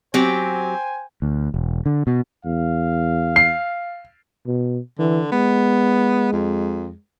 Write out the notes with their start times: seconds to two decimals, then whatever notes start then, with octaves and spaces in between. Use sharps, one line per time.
0.14 F#3 C4 G4 C5 G5 G#5
1.22 D2
1.54 E1
1.86 D3
2.07 B2
2.45 E2 F5
3.36 C7
4.46 B2
4.99 D3 E3
5.32 G#3 B3
6.32 F2